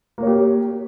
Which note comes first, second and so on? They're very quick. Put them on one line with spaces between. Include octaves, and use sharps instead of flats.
A#3 C#5 G4